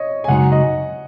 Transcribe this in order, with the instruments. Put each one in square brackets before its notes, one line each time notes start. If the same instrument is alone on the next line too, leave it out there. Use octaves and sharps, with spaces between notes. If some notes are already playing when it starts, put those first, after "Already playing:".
Already playing: [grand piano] C#5 D#5
G#5
[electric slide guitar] F#2 C#3 G#3 D#4 F#4 [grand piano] F#5
[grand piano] D#5